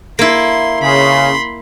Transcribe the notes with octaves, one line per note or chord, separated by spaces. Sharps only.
A#3 E4 C6
C#3 B5 C6